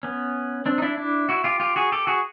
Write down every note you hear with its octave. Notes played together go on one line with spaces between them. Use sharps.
B3 C#4
C4 D4
D#4
D4 E4
D4 E4
E4 F#4
F4 G4
F4 G4
F#4 G#4
G4 A4
F#4 G#4